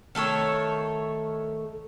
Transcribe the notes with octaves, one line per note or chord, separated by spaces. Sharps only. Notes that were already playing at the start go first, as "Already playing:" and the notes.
D#3 A3 A4 C#5